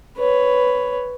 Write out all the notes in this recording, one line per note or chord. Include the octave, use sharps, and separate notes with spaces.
B4 C#5